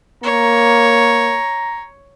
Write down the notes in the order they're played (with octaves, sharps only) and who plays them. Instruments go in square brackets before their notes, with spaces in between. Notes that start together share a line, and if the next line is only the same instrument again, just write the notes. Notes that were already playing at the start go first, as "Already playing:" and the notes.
[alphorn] A#3 [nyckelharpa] C#5 [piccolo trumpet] A#5